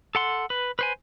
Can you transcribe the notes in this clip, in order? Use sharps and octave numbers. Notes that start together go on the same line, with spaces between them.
A4 F#5 C6
B4
B4 C5 G#5